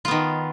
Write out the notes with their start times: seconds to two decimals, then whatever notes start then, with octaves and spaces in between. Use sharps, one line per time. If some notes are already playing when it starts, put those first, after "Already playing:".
0.05 F4
0.08 B3
0.11 D#3